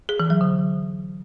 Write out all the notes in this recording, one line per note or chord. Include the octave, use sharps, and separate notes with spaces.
G#4
E3
F#3
D3